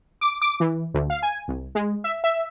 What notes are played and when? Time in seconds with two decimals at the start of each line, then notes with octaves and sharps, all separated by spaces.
0.21 D6
0.42 D6
0.60 E3
0.94 D2
1.10 F5
1.23 G#5
1.48 C2
1.75 G#3
2.04 E5
2.24 E5